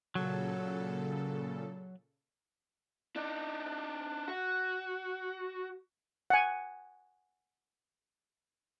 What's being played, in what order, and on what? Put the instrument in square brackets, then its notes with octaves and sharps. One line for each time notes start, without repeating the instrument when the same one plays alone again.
[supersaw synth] A#2 C#3 A4 [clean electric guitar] F#3
[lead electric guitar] D4 D#4
F#4
[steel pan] F#5 G#5